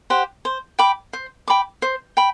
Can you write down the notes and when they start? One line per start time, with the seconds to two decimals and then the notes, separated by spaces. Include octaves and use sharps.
0.10 G4 C5 F#5
0.45 C5
0.79 G5 B5 D6
1.13 C5
1.48 G5 B5 D6
1.82 C5
2.17 G5 B5